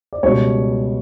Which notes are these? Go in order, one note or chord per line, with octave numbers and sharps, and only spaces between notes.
D5
C#2 B2 G3 C#5